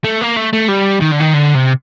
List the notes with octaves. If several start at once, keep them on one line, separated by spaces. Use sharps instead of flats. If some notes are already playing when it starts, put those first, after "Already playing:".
A3
A#3
A3
A3
G3
D#3
D3
D#3
D3
C3